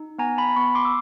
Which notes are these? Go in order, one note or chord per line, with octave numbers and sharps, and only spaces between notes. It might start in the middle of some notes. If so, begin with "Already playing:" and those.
Already playing: D#4
B3 G#5 A#5
A5 B5
B3 B5 C#6
C6 D6
E6